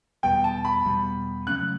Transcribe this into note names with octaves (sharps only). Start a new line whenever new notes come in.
E2 B2 G3 B3 G5
A5
B5
E2 B2 G3 B3
C#3 F#3 A3 C#4 F#6